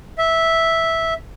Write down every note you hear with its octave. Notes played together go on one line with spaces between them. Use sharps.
E5